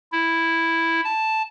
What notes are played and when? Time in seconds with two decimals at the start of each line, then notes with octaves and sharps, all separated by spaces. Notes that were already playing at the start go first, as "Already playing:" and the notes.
0.12 E4
1.04 A5